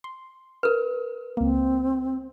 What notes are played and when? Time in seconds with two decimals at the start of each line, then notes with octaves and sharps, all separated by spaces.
0.04 C6
0.63 A#4 B4
1.37 C#2 A#3 C4